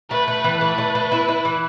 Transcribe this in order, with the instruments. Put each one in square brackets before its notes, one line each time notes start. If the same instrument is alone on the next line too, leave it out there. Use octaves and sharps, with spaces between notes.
[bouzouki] A3 [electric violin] B4
[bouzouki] A3
E3
[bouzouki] A3 [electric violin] B4
[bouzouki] A3
A3
E4
E4
E3